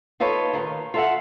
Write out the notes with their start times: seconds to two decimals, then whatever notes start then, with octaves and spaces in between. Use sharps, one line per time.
0.20 D#4 F4 A4 B4 C#5
0.53 D#2 A#2 D#3 F4
0.94 F4 A4 E5 F#5